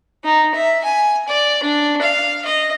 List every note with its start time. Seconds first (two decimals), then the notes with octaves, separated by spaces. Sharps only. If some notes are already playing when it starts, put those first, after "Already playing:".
0.24 D#4
0.54 E5
0.84 G#5
1.28 D5
1.63 D4
2.01 F5
2.45 D#5